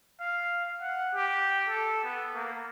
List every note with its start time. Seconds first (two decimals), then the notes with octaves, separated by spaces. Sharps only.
0.21 F5
0.81 F#5
1.14 G4
1.68 A4
2.04 B3
2.34 A#3